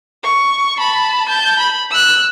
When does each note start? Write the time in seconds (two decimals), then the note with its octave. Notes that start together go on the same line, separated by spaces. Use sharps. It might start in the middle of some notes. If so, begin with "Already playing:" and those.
0.23 C#6
0.78 A5 B5
1.25 A5 G6
1.59 B5
1.91 E6 F#6